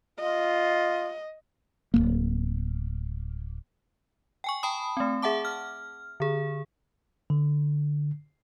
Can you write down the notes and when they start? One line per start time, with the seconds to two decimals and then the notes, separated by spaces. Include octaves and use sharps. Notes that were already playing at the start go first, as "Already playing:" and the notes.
0.20 F4 D#5
1.94 D1 G#1 A#3
4.44 G5 G#5 C#6
4.63 G5 A5 B5 D#6
4.97 A3 C4
5.22 G#4 E5 F#5 A5 D6
5.45 F6
6.20 D3 G#4
7.30 D3